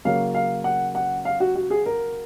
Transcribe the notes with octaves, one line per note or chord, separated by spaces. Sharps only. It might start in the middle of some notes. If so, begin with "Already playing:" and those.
C#3 F#3 A#3 C#4 F5
F5
F#5
F#5
F5
F#4
F#4
G#4
A#4